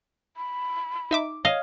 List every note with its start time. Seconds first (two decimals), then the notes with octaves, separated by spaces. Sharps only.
0.37 B5
1.11 D#4 E5 D6
1.45 C#5 D#5 F5